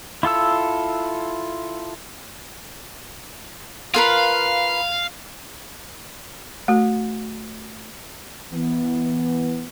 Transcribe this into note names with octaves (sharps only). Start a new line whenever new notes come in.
E4 F4 A4 E6
F4 A#4 B4 F5
A3 F#4
E3 B3